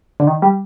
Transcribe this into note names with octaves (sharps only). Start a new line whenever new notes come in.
D3
D#3
G3